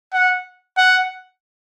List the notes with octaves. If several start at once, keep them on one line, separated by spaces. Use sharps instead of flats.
F#5
F#5